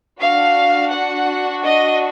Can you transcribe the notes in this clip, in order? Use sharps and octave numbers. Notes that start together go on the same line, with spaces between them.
D4 F#4 F5
F#5
D#5